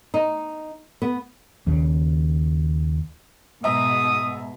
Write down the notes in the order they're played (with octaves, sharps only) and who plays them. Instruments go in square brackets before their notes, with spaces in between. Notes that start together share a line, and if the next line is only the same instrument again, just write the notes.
[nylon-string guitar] D#4
B3
[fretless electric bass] D#2 C#3
[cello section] G#2 B2 G#3 [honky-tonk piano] E5 A#5 [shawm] D#6